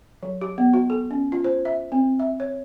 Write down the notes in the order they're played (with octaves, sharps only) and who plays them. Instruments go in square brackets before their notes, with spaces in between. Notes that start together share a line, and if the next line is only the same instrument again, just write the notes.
[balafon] F#3
G4
B3
F#4
A4
C#4
F4
C5
E5
C4
E5
C#5